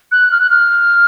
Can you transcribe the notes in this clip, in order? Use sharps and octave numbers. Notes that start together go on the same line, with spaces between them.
F#6
F6
F#6
F6